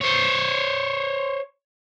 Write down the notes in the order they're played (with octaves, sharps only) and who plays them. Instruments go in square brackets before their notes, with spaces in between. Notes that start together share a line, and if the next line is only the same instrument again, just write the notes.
[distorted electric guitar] C5 C#5